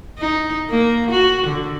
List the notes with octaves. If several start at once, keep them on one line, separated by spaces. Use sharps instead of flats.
D#4
A#3
F#4
D3